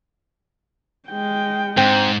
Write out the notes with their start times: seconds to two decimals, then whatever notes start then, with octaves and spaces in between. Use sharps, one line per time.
1.08 G#3 G5
1.77 G#2 C4